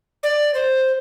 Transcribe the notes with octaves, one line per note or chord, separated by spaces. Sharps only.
D5
C5